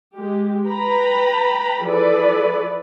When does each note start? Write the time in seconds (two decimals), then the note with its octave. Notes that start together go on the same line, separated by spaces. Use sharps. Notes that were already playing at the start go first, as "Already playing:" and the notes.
0.16 G#3 G4
0.67 B4 G5 A#5 B5
1.82 E3 F3 G#4 A4 B4 D5